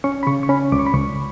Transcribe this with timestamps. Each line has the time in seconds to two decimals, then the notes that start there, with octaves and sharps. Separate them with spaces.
0.04 C#4 C#6
0.23 B5
0.27 C#3 C#6
0.43 C#6
0.49 C#4 B5
0.72 C#2 D6
0.79 C#6
0.86 B5
0.94 C#2 C#6